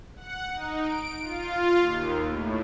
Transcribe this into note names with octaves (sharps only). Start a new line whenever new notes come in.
F#5
D#4
D7
F4
D#2
A2